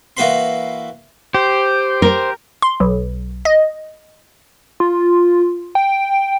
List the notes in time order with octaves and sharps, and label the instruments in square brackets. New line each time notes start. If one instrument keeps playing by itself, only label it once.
[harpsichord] E3 A#3 F#4 B4 B5 C6
[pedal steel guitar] G4 [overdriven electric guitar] C5
[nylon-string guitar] A#4
[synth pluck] C6
B1
D#5
[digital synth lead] F4
G5